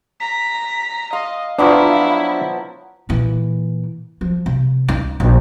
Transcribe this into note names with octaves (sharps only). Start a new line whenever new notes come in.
A#5 B6
D#5 F5 C6
F3 F#3 B3 D4 E4 F4
A#2 E3
F3
C3
C#2 D#4
A#1